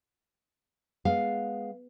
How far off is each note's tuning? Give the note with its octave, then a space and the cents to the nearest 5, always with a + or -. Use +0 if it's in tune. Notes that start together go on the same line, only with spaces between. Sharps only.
G#3 +0 B3 +0 F5 +0